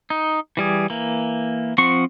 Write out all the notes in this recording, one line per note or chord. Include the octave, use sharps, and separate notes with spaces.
D#4
E3 G3 G#4
E3 A#3
F3 C4 C5 F#5 C#6